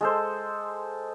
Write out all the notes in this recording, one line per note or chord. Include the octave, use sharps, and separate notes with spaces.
G#3 A4 C5